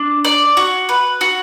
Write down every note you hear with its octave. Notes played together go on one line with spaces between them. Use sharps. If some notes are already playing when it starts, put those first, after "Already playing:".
Already playing: D4
D5
F#4
B4
F#4